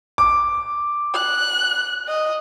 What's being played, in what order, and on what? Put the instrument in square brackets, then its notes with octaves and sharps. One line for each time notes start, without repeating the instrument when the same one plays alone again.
[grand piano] D6
[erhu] F#6
D#5